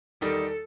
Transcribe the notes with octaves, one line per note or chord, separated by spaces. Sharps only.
E2 D#3 G3 D#4 A4